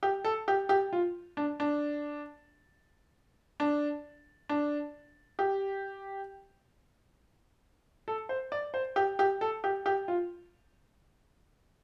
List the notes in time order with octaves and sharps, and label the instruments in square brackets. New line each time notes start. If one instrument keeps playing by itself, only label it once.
[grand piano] G4
A4
G4
G4
F4
D4
D4
D4
D4
G4
A4
C5
D5
C5
G4
G4
A4
G4
G4
F4